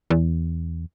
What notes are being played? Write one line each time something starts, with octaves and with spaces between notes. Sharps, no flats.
E2